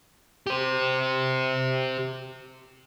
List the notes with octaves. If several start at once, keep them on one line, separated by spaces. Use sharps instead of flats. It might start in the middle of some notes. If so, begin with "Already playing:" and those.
G4 C5